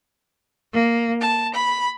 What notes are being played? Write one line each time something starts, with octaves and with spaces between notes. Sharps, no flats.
A#3
A5
B5